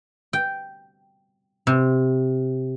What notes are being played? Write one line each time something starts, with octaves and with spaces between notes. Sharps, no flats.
G5
C3